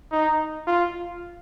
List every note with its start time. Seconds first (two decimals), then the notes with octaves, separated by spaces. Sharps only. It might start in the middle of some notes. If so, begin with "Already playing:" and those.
0.12 D#4
0.67 F4